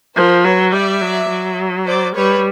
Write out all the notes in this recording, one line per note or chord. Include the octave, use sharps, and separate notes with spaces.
F3 A#4 C5
F#3 B4 C#5
G3 D5 E5
F#3
F#3
C5 D5
G3 B4 C#5